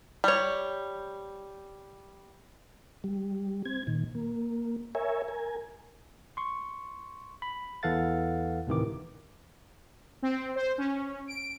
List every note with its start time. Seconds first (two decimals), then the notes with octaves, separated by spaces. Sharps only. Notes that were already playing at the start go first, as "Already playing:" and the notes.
0.24 G3 C#5
3.04 G3
3.65 C4 G#6
3.87 A#2 D#3
4.15 A#3
4.95 A#4 C#5 E5 G#5
5.28 A#4 G#5
6.37 C6 C#6
7.42 B5
7.83 E2 E3 A4 F5 F#5 A6
8.67 D2 A2 C3 D#3 E3 D6
10.22 C4
10.56 C5
10.78 C#4
11.28 D7